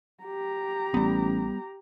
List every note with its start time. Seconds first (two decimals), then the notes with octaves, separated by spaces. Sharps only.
0.23 G4 A#5
0.94 A1 G3 B3